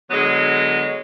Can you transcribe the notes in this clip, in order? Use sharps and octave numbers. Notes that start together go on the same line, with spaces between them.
D3 F#3 G#3 B3